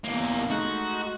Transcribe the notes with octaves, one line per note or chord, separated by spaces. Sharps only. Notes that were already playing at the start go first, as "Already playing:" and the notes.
E2 A#3
G#3 A3 D#4 F#4